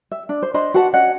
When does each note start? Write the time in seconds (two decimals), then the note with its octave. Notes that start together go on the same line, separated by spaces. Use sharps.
0.11 E5
0.29 D4
0.42 C5
0.54 D4 C5 D#5 B5
0.74 F#4 B4 F#5 A5
0.93 C#4 D#5 F#5